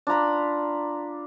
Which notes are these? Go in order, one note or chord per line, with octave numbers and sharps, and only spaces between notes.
D4 F4 A#5 B5